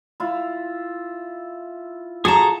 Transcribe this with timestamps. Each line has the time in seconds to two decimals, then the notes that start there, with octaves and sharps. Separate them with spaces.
0.20 E4 F4
2.25 F#4 G#4 A4 A5 A#5